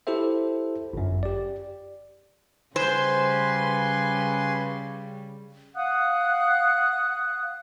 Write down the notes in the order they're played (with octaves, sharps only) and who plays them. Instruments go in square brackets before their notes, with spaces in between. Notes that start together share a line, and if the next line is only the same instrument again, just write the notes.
[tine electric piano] E4 G4 A4 C5 E5
G1 F#2
G4 D5
[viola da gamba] C#3 G3 [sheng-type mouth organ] B4 G#5 C6 [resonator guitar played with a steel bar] C5
[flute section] F5 F#5 D#6 F#6